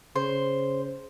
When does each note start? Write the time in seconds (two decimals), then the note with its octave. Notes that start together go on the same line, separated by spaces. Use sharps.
0.15 C#3 C5